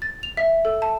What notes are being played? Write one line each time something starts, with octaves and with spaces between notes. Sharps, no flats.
A6
F7
E5
A4
A5